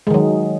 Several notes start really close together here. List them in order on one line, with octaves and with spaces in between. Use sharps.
G#3 D#3 F#3